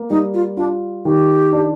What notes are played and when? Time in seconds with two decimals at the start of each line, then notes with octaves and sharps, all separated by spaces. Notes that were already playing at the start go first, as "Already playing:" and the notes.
Already playing: A#3
0.10 G3 D#4
0.34 F4
0.57 D4 F4
1.05 D#3 G4
1.53 D4